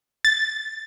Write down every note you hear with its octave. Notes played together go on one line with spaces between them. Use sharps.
A6